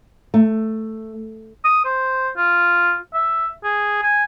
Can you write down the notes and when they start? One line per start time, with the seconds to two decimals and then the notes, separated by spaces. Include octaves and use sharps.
0.34 A3
1.65 D#6
1.85 C5
2.37 F4
3.14 E5
3.64 G#4
4.03 G#5